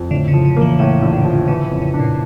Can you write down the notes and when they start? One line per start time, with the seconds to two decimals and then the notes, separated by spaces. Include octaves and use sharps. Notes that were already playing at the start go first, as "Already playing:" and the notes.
Already playing: F2
0.11 A2 D3
0.28 C#3
0.34 F3
0.45 C#3
0.57 E3 A#3
0.79 A2 C#3
1.02 A#1
1.13 D3
1.25 F3
1.48 C#3 E3
1.64 C#3
1.71 F2
1.82 C#3
1.94 D4
1.99 A#2